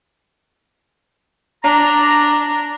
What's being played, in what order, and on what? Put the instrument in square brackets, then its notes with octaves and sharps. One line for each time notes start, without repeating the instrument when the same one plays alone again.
[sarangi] D4 [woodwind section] A#5